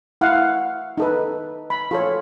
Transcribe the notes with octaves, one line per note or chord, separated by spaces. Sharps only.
E4 F5 F#5
D#4 A4 B4
B5
F4 A4 C#5